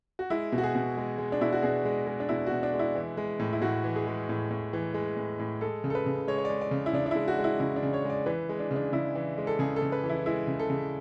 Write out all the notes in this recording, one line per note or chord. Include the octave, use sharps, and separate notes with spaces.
F#4
G#3 E4
B2
F#4
G#4
B2
G#3
G#3
D4
B2 E4
F#4
B2 G#4
G#3
G#3
D4
B2 E4
B2 F#4
D4
G#3
E4
E3
G#3
A2
E4
A2 F#4
E3
G#4
G#3
A2
A2
E3
G#3
A2
A2
G#3 A4
C#3
A4
B4
C#3
G#3 C#5
C#5
G#3 D5
D5
C#3
E4
C#3 D4
D4
G#3 E4
F#4
G#3
E4
C#3 E4
D4
C#3
C#5
G#3
D5
E3 B4
G#3
D4
C#3
D4
C#3 E4
E3
G#3
A4
C#3 G#4
A4
C#3
B4
E3
E4
G#3 E4
C#3
A4
C#3